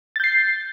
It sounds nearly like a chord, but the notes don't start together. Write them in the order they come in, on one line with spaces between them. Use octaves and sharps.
A6 G6 C7